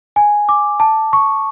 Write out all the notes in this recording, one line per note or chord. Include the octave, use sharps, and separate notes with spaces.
G#5
D6
A5
C#6